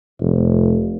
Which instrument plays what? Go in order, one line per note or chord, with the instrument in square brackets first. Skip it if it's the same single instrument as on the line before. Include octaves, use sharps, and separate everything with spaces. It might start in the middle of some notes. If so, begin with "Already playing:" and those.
[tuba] F1